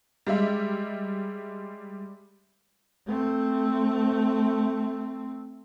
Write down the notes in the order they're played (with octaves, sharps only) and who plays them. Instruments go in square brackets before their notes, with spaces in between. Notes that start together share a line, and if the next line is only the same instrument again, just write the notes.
[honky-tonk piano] G3 G#3 E5
[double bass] A3 C4